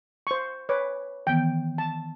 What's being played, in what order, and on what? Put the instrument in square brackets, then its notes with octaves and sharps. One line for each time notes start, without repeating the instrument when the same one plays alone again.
[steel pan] C5 C#6
B4 C#5 D6
[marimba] D#3 E3 B3 [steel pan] G5
[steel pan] A5